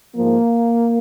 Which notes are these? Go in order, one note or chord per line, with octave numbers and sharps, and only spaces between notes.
G#2 F3 A#3